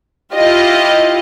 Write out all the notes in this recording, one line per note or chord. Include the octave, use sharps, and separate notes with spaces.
E4 F4 G4 D#5